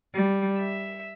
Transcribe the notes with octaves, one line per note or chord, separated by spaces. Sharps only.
G3
E5